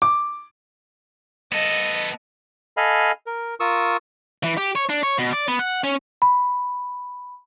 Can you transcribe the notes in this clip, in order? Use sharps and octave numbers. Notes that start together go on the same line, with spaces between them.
D6
B3 A4 D#5
A4 D#5 F5 G#5 B5 F6
A#4
F4 A#4 C#6 D#6 E6
E3
G4
C#5
D4
C#5
B2
D5
B3
F#5
C#4
B5